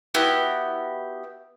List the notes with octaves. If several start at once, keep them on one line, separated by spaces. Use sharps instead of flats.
B3 E4 F#4 G4